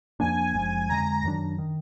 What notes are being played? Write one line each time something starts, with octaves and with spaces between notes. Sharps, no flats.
F2 F3 A#3 D4 G#5
F#1 F#2 F3 G#3
F2 D3 G#3 A#5
F#2 D#3 F#3 D4
D#3